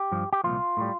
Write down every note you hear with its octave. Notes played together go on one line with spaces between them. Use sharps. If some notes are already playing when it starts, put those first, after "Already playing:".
Already playing: G4
G2 F3
G4
C2 A#2 F3 F4
A2 G3